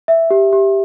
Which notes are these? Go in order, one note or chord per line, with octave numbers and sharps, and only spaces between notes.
E5
G4
G4